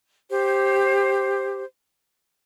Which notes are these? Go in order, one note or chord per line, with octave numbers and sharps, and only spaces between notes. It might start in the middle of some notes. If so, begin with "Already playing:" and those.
G4 C5